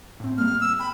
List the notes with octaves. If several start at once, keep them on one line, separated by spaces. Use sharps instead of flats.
A2 C4
G3 A#3 F6
E6
G5 B5